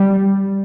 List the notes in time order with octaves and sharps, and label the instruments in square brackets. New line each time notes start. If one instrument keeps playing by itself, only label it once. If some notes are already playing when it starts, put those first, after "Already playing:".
Already playing: [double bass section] G3